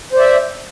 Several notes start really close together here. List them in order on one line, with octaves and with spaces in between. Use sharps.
C5 D5 E5